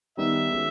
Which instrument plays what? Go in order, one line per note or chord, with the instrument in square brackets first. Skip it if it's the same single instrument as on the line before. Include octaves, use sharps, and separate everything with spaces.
[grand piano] D#3 G3 B3 D#4 [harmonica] E5
[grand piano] D#3 G#3 C#4 F#4